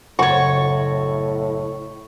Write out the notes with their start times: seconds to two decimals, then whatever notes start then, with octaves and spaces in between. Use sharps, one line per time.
0.19 F#1 A2 F#4 C#5 C#6 A6